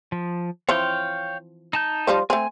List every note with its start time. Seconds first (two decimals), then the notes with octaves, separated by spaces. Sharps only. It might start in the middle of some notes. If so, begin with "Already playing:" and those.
0.12 F3
0.69 E3 F3 C4 C#5 F5 G5
1.73 D#4 A5 G6
2.07 F3 G3 C5
2.30 A3 C4 G#5